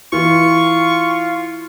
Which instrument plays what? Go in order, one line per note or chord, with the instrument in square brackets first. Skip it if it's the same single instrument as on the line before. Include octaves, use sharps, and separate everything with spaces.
[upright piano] E3 [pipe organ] F4 [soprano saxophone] C#6